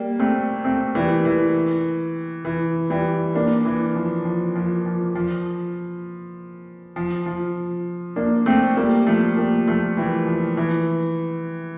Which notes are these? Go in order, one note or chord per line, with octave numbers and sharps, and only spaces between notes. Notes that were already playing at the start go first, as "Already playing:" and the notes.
Already playing: G3 A#3
A3 C4
A3 C4
E3 G3
E3
E3
E3 G3
A#3 D4
E3
F3
F3
F3
F3
F3
F3
F3
A#3 D4
A3 C4
G3 A#3
F3 A3
G3 A#3
F3 A3
E3 G3
F3
E3